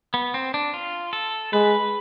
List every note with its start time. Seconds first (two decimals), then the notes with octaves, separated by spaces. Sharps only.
0.14 B3
0.34 C4
0.54 D4
0.74 F4
1.13 A4
1.53 G#3 B4